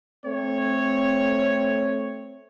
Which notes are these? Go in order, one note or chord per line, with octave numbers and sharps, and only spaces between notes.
A3 C4 C#5